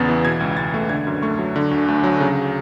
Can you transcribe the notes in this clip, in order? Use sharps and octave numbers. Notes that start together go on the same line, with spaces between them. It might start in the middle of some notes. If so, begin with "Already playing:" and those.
Already playing: E2 C#3 B3 A6
E3
B2 G#6
C#2
C#2 A6
A3
D3 G#6
F#2
A3 C#6
F#3
D3
D2
D2
F#3
C#3